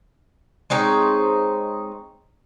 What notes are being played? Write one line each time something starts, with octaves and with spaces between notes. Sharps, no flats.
G#3 C4 D#4 C#5